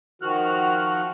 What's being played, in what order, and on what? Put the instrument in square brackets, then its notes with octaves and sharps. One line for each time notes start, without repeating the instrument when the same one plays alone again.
[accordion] D#3 F3 F#4 F6 F#6